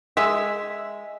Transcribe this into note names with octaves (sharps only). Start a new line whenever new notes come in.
G#3 E5